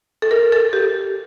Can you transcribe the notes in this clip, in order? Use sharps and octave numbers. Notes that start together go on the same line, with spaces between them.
A4
A#4
A4
G4